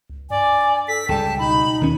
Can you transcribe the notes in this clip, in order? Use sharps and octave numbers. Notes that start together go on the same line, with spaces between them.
C#2
G2 D5 G#5
A4 B6
C#2 C#3 G3 G5 A5
B2 D#4 B5
D#2 D#3 C#4